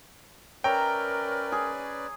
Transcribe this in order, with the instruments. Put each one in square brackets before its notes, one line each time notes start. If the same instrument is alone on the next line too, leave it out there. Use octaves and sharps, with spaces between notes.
[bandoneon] C#4 B4 D5 [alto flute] A#4 [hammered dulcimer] C#5 E5 A#5 [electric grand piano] G5
[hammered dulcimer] G#4